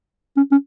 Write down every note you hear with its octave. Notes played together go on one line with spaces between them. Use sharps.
C#4
C#4